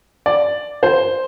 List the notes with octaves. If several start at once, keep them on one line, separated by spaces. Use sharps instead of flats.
D5
C5